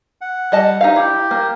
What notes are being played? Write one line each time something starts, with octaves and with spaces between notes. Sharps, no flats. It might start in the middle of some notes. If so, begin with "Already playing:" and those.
F#5
G3 D#5 A5
D#4 G4 F5
E4 G4
A#3